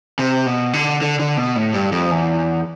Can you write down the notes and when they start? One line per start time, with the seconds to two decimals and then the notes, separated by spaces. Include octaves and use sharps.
0.19 C3
0.46 B2
0.73 D3
1.01 D3
1.19 D3
1.37 B2
1.56 A2
1.74 G2
1.92 F2
2.11 E2